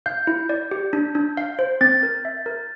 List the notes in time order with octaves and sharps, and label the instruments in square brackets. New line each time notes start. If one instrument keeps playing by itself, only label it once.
[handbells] F5 [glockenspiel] G6
[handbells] E4
D5
G4
D4
D4
F5
C5
[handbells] C4 [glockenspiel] A6
[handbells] A#4
E5
A#4